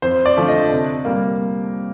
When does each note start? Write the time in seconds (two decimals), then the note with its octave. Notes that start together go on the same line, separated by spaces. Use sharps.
0.02 F2 C5
0.26 D5
0.37 D3 F3 A3
0.48 D#5
0.71 C3
1.05 G3 A#3